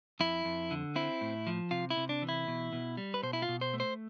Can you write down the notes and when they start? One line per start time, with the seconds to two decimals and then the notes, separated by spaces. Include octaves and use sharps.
0.20 F2 E4
0.45 F2
0.71 D3
0.96 C4 E4
1.21 A2
1.47 F3
1.71 C3 F4
1.90 E4
1.97 C3
2.09 D4
2.22 E3
2.29 E4
2.48 B2
2.73 B2
2.97 G3
3.14 B4
3.23 B2 C5
3.33 E4
3.42 F4
3.49 B2
3.61 C5
3.74 A3
3.80 C5